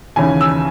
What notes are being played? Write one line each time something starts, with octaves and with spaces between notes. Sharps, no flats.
D#2 C#3 E3 G#5
E6